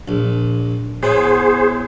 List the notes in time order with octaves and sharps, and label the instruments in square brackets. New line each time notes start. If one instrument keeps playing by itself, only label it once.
[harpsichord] A#1
[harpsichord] A2 B3 [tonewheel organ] G#4 C5